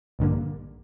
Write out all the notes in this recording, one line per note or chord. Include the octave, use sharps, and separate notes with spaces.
A#1 G2 D3 A#3